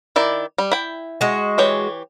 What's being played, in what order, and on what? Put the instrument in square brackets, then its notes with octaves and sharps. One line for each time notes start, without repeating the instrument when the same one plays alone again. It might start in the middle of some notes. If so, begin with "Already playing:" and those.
[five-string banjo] D#3 E4 D5
G3
E4 G5
[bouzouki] G#3 F#4
[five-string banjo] E3 G4 C#5